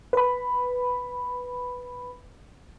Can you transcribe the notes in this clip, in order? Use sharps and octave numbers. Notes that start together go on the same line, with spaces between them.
B4 B5